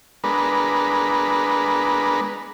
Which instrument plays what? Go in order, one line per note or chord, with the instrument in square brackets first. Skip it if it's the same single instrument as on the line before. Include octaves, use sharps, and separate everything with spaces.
[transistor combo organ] G#3 B3 D4 A#4 B4